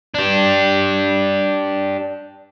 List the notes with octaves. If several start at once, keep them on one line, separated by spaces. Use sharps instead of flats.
D4 G4